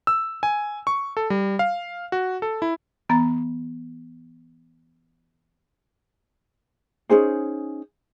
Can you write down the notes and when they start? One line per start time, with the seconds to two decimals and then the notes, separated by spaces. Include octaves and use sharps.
0.07 E6
0.43 G#5
0.87 C#6
1.17 A4
1.30 G3
1.59 F5
2.12 F#4
2.42 A4
2.62 E4
3.09 E3 B3 A#5 A6
7.10 C#4 D#4 G#4 C5